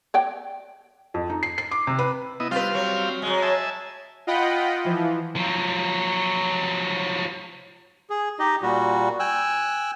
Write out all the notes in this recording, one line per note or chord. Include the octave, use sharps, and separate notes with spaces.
C#5 D5 G5
F2
D#4
C7
C7
D6
C3
B4
B3 E4 D#5
G3 C4 F4 B4 F5
F#3
F#3 G#3
E5 G#5 A5
F4 D#5 F#5 G5 B5
E3 F3
F3 F#3
G#4
D#4 G4 D#5
A#2 G3 F#4
G5 G#5 E6 F#6